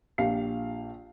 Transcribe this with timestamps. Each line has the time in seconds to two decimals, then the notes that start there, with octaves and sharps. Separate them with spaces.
0.18 A#1 G4 F5 C7